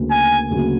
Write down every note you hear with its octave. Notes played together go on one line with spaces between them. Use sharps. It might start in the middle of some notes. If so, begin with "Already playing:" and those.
Already playing: D2 C#3 F#3 A#3
G#5
D2 C#3 F#3 A#3